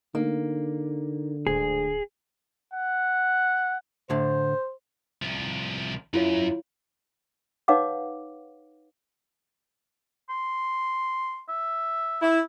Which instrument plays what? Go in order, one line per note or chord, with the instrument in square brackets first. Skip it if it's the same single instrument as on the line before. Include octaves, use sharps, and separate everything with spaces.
[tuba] D3 [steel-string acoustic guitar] A#3 [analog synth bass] D#4
[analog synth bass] D1 [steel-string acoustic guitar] D2 G#2 [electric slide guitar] G#4
[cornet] F#5
[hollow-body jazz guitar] A2 D3 [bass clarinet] C5
[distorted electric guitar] C2 F3
[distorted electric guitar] F#2 [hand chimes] E4 F4 C#5
[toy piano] D#4 B4 C#5 F5 F#5 D6
[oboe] C6
E5
[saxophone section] E4